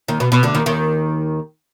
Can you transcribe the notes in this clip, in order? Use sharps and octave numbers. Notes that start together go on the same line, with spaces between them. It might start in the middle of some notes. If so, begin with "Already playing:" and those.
D#2 D#3
B2
B2
D2 D3
D#2 D#3
D#2 D#3